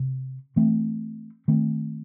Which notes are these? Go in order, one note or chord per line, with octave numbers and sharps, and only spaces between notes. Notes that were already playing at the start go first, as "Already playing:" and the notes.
Already playing: C3
E3 A3 C4
D#3 A3 C4